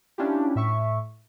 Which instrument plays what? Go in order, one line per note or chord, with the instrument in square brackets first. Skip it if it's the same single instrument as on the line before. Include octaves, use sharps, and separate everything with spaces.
[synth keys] C#4 D4 E4 F4 G4
A2 E5 C#6